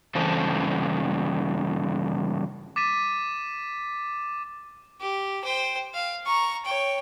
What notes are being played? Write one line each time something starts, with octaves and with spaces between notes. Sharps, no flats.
G2 C#3 E3 A4 C5 A5
D6 A6 B6 D#7 E7
G4
C5 G5
F5
A#5 C#6
C#5 G5